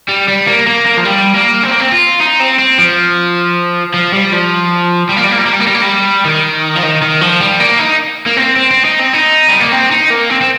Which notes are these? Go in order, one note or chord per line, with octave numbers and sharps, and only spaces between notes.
G3
G3
A#3
A#3
A#3
F3
G3
A#3
C4
A#3
C4
F4
D#4
C4
C4
F3
F3
G3
F3
G3
A#3
G3
A#3
G3
A#3
G3
A#3
G3
A#3
G3
D#3
F3
D#3
D#3
F3
G3
A#3
D#4
A#3
C4
C4
C4
D#4
C4
D#4
G3
A#3
C4
D#4
A#3
C4
C4